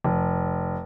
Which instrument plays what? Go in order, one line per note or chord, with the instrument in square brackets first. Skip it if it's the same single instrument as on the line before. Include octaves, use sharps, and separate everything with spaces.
[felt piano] F1